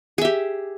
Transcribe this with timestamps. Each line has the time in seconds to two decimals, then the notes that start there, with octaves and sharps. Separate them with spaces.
0.18 G#4
0.21 E5
0.25 G4